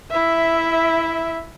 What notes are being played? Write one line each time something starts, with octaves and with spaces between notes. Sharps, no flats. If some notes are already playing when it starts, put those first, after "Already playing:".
E4 E5